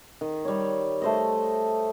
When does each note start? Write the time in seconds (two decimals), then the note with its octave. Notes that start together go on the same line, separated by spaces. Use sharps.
0.21 D#3
0.45 G3 C#5
1.02 A3 C5 D#5